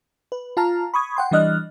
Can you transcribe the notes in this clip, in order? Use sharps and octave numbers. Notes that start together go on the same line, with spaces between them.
B4
F4 A5 A#5 F6
B5 C#6 D#6 G#6
F#5 G5 C6
E3 G3 D4 D#5 F6 F#6